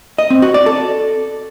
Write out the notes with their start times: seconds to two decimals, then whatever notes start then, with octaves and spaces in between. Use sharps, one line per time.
0.18 D#5
0.30 C4
0.42 F#4
0.54 D5
0.66 A4